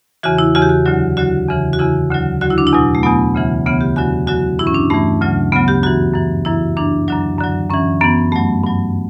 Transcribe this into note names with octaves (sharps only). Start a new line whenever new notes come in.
E2 C#3 E3 F#4
E4
E2 C#3 E3 F#4
G4
F#4
D2 D3 F#3
D2 D3 F#3 F#4
E2 C#3 E3
F#4
E2 C#3 E3 E4
D2 D3 F#3
D2 D3 F#3 F#4
E4
D4
E4
E2 B2 F#3
A3
E2 B2 F#3 B3
D2 C#3 E3
D2 C#3 E3 B3
G4
E2 D3 F#3 F#4
E2 D3 F#3 F#4
G2 E3 E4
C#4
D4
G2 E3 A3
D2 C#3 F#3
D2 C#3 F#3 B3
G4
F#2 E3 F#4
F#2 E3
F#2 E3 E4
F#2 E3 D4
F#2 D3 F#3 D4
F#2 D3 F#3
F#2 E3 C#4
F#2 E3 B3
G2 F#3 A3
G2 F#3